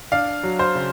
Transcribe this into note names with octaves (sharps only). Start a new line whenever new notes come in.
D4 F5
F#3
C5
C#3